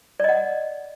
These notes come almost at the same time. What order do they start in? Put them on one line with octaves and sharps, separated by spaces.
D5 D#5 F#5